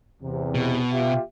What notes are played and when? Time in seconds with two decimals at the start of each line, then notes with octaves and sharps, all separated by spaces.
0.23 E2 C3
0.55 B2
0.92 F4 G4 E5